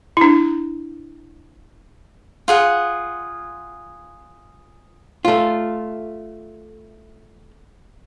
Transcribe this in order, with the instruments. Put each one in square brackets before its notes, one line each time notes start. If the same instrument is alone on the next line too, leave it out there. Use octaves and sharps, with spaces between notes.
[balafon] D4 E4
[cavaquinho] F4 G#4 F#5
[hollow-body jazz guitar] A3 F4